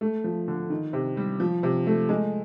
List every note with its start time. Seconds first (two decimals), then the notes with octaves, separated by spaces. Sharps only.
0.01 A3
0.24 F3
0.48 D3
0.70 D#3
0.93 C3
1.17 G3
1.40 F3
1.63 C3
1.87 A3
2.09 G#3